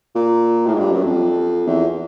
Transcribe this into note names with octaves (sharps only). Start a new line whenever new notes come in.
A#2
A2
G#2
G2
F#2
F2
E2